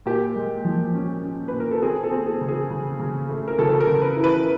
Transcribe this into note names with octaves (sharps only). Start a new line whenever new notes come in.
A#2 G4
G#3
F3
C#4
C#4
A#2 B4
A#4
A4
C4 G#4
A4
C4
G#4
C#3
G#4
C#3
C#3
A3
A#4
C#3 A4
A4
A#4
C#3
B4
E3
B4